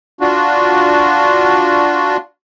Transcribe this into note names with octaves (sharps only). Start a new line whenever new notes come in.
D4 F4 F#4